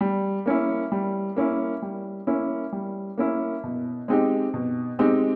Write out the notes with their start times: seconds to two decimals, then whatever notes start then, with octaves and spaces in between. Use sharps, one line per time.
0.01 G3
0.46 A#3 C#4 E4
0.92 G3
1.36 A#3 C#4 E4
1.82 G3
2.27 A#3 C#4 E4
2.73 G3
3.18 A#3 C#4 E4
3.64 B2
4.08 G#3 C4 D#4 G4
4.54 B2
4.99 G#3 C4 D#4 G4